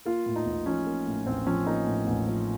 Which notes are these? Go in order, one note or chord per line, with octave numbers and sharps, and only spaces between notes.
A#3 F4
A2
D#4
A1
F3 C#4
A#3
A2
A1 C4
F3 C#4
A#3 D#4
A2
A1
F3